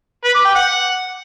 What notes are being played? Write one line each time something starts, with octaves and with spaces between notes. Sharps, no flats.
B4
D6
G5
F#5